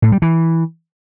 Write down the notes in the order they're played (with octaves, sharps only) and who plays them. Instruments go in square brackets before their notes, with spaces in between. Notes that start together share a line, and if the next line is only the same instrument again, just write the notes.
[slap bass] A2
G3
E3